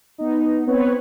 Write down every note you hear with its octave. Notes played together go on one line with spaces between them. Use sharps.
B3 D#4
B3 C4 B4 C#5